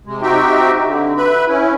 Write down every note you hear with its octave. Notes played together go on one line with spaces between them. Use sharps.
C3 G#3
C4 D#4 F#4 G4 E5 G5
D3
B4 E5 B5
C#4 E4